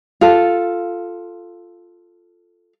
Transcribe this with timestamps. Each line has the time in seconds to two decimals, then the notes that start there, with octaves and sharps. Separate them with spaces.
0.21 F4 A4